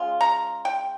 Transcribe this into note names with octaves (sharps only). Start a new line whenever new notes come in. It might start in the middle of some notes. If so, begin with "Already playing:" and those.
Already playing: C#3 G#3 F4
A#5
G5